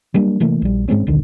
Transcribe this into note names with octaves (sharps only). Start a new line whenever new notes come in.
F#3 G3 A#3 D4
C3 E3 A3 A#3
A#1 G3
G#2 G#3 C4 C#4
D#1 B1 D3 D#3